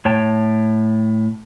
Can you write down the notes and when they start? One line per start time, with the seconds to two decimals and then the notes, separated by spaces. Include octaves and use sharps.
0.05 A2 C#5 G5 A5